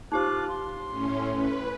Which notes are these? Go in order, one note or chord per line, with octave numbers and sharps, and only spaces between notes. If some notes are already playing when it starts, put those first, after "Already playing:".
D#4 F4 G4 C5 D6 F#6
C6
A2 C#4
B4